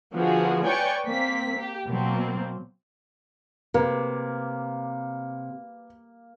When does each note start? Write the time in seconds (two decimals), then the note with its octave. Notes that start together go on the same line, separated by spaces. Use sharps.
0.14 D3 F3 B3 F#4 G#4
0.65 B4 C#5 D5 G5 G#5 C#6
1.06 A#3 C4 B6
1.59 G4
1.87 B2 F#3 A#3 C4
3.74 C3 A#3 B4